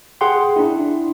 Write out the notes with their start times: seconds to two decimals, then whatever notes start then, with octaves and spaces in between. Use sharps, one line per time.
0.21 G#4 F#5 G5 C6
0.56 D4 E4